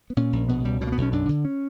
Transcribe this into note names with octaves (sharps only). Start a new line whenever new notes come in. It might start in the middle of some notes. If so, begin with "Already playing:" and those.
B3
A#2 C#4
A#1
B2 B3
C#2 G3
B2 G3
A#3
B3
B1 C#4
F#2 D4
D3
C#4